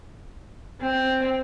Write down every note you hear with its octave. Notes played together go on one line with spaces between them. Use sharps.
C4